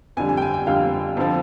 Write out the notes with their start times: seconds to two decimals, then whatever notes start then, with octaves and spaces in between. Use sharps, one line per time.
0.17 F2 D3 G3 G#5
0.29 G#5
0.37 G5
0.42 G#5
0.54 G5
0.67 F2 D3 G3 F5
1.17 F2 D3 F3